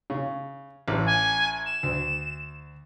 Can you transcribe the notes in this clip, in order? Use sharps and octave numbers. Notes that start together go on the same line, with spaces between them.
C#3
A1
G#5
E7
D2